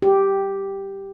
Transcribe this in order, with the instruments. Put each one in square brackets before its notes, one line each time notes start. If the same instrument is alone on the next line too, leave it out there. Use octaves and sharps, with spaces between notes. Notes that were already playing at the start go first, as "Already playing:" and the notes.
[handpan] G4